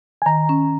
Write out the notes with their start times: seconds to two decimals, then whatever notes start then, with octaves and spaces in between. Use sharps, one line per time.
0.22 G#5
0.26 D#3 A#5
0.49 C#4